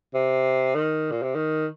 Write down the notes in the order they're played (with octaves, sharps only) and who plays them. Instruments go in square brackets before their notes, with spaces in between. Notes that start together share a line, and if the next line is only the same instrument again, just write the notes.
[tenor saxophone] C3
D#3
A#2
C3
D#3